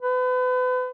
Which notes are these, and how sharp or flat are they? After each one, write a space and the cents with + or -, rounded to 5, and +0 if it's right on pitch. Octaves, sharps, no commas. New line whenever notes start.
B4 +35